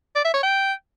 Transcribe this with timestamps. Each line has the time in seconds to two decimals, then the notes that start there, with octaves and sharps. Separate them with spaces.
0.15 D5
0.25 E5
0.34 C#5
0.43 G5